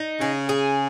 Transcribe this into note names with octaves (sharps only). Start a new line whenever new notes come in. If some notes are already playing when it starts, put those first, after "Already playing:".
Already playing: D#4
C#3 G#4
G#4